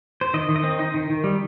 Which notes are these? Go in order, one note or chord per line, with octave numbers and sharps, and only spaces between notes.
C5
D#3 D#5
D#3
D#5
C4
D#4
D#3
D#3
G3